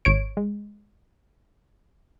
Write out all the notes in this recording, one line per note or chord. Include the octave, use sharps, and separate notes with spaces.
G#1 C#5 D7
G#3